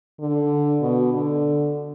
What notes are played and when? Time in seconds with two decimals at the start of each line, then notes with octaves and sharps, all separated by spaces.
0.20 D3
0.81 B2
1.13 D3